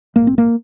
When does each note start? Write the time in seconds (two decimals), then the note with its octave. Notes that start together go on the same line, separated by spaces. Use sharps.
0.16 A#1 G#2 A#3
0.27 C4
0.38 A#3